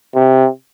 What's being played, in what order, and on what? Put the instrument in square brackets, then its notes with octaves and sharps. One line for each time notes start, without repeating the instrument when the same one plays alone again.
[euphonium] C3